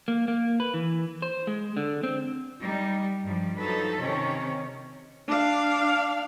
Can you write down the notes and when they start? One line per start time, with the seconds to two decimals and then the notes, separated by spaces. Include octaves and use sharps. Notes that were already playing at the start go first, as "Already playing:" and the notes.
0.08 A#3
0.28 A#3
0.60 B4
0.74 E3
1.22 C5
1.47 G#3
1.77 D3
2.03 C4
2.61 G3 D#4
3.22 G2 F3 G3
3.57 F3 F#3 D#4 A4 B4
3.98 C3 D#3 C#4 C#5
5.28 D4 F5